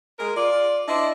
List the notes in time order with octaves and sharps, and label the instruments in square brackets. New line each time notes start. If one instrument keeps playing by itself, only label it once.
[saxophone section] G#3 A#4
F4 D5
D4 E4 C5 D5 D#5